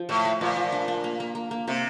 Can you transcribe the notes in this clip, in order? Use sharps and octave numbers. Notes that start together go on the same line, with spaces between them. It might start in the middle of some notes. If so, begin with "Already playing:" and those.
Already playing: F3
A2 A3
A3
A#2 F3
F3
D4
D4
A#3
A#3
A#3
A#3
C3 A#3